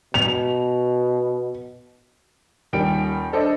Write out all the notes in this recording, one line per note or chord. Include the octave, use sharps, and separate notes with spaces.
B2 F7
D#1 D#3 G3 G5 D7
D4 A4 C5 D5 D#5